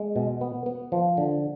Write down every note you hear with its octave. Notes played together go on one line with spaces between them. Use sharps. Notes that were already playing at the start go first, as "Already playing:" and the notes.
Already playing: G#3
B2
B3
B3
F3
D3